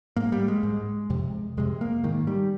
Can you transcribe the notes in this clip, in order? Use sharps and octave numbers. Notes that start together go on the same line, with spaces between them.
G#2 A#3
G3
G#3
G#2
F2 C3
F2 C3 G#3
A#3
G#2 D#3
G3